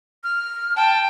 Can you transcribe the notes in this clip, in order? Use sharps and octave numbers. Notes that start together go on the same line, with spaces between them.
F6
G5 A5